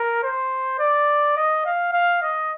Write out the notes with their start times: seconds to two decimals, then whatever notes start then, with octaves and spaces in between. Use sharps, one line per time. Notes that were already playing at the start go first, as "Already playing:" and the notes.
Already playing: A#4
0.23 C5
0.79 D5
1.37 D#5
1.66 F5
1.93 F5
2.22 D#5